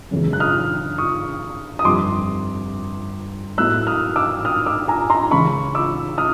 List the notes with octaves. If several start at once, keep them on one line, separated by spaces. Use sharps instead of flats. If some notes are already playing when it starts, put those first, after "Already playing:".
F#2 C#3 E3 G#3 B3
F#6
D#6 F6
C#6 D#6
D#6
G1 F2 C3 C6 D6
A2 F#3 B3 E4 E6 F#6
D#6 F6
D6 E6
D#6 F6
D6 E6
G#5 A#5
A#5 C6
C#2 C#3 E3 B5 C#6
D6 E6
D#6 F6